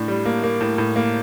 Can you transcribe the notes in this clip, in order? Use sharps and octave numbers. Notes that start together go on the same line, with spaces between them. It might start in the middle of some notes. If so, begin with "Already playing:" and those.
Already playing: A2 D4
G3
A#3
A#3
A2
A2
A#3